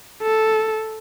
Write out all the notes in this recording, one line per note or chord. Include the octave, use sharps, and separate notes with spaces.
A4